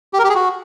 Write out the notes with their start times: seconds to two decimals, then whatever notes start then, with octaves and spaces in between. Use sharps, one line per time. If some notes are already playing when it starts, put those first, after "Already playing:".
0.13 G4
0.19 A#4
0.24 G4
0.30 G#4
0.35 F#4